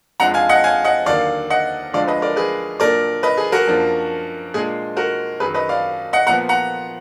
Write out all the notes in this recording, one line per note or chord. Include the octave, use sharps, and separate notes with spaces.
F2 F3 G#3 D4 F#5 A#5
F5 G#5
D#5 F#5
F5 G#5
D#5 F#5
D#2 D3 F#3 A#3 D5 F5
D#5 F#5
D2 D3 F3 G#3 D4 D5 F5
B4 D#5
A#4 D5
G#4 B4
A#2 F#3 D4 A#4 D5
B4 D#5
G#4
F#4 A#4
F#2 F3 A#3 D4
A#2 G#3 D4 G#4
F#4 A#4
F#2 D#3 F#3 G#4 B4
B4 D#5
D5 F5
D#5 F#5
A#2 F3 B3 F#5 A#5
F#5 A#5